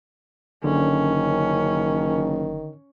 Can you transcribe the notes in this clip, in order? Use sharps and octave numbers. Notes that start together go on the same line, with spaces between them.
F#1 D3 D#3 C#4